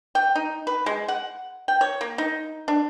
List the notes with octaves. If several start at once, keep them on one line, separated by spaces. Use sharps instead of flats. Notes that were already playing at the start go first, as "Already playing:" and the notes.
G5
D#4
B4
G#3
F#5
G5
C#5
A#3
D#4
D4